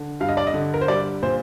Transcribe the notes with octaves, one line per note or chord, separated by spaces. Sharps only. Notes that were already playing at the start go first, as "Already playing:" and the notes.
Already playing: D3
G2 F5
D#5
D5
D#5
D3
A#4
C5
G3 D5
A#2 C5